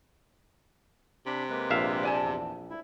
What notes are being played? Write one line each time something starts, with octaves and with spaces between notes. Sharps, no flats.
C3 D4 B5
G#3 A#3 B4
A#1 E5 F5
D5 G#5 A5
E2
E4